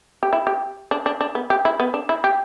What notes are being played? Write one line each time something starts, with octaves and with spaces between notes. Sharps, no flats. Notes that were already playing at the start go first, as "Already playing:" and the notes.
G4
E4
G4
D4
D4
D4
B3
G4
E4
B3
D4
E4
G4